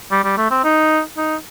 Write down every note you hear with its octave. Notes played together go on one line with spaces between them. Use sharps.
G3
G3
A3
C4
D#4
D#4